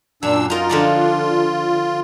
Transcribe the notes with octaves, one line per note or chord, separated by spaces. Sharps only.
F#2 A#2 D4 E6
D#4 F4 A#4
D3 F3 D5